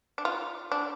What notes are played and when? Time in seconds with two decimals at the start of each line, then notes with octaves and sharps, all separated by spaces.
0.18 D4
0.25 F4
0.71 D4